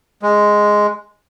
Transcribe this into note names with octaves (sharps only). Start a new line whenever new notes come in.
G#3